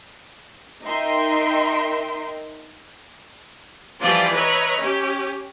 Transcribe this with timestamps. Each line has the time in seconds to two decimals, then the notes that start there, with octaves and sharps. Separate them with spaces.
0.83 D#4 A#4 D#5 E5 G5 C6
4.00 E3 F3 G3 F4 C5 D5
4.32 B4 C#5 D#5 E5 A#5
4.80 C#4 G4